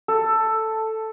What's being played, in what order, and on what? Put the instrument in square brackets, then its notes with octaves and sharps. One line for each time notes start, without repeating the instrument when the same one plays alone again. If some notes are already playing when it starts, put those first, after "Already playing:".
[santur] A4